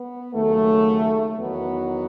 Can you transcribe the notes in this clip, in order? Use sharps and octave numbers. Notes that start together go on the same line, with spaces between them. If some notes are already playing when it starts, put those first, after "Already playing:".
Already playing: B3
D#2 C#3 F#3 A3
E2 D#3 F#3 B3